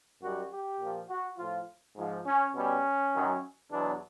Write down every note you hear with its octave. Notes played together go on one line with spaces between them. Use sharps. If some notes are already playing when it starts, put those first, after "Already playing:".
F#2 D#3 G3 F#4
G4
A#2 F3
F#4
A2 F3 F4
G#2 F3
C#4
B2 G3 C#4
F#2 D#3 F#3
E2 B2 F#3 D4